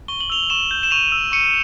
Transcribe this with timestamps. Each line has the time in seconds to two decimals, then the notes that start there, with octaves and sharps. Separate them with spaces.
0.08 C#6 G7
0.20 F#7
0.30 E6 F7 G7
0.50 C#6 E7 F#7
0.71 G6
0.83 E7
0.91 C#6 D#7 F7
1.12 E6
1.32 C#6 C#7 D#7